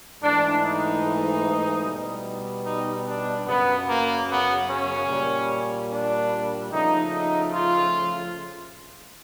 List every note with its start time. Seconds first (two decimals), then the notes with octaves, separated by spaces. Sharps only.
0.22 G#2 E3 A3 D4
0.62 D#4
1.84 B2 G3
2.65 D#4
3.06 D4
3.47 F#2 C#3 F#3 B3
3.87 A#3
4.28 B3
4.69 C#4
5.09 A#2 G3
5.90 D4
6.71 C#3 F3 A3 D#4
7.12 D#4
7.53 F4